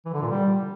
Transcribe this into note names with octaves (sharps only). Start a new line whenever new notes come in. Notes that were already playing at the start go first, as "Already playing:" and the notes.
E3
D3
A#2
G3